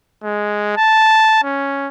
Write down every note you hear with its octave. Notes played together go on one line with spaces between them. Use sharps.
G#3
A5
C#4